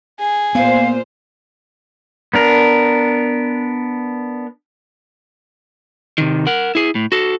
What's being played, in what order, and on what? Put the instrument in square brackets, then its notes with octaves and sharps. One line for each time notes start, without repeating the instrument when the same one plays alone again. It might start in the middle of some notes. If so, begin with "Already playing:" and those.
[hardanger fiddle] G#4
[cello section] A#2 F4 C5 [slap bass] B3 [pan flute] F5
[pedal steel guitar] B3 D4 A#4
[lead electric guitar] C3 D#3
A#4 F#5
E4 G#4
A2
F#4 A4